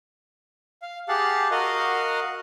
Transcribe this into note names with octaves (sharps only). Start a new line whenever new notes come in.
F5
G4 G#4 F5 F#5 A5
F#4 A#4 D#5 F5 F#5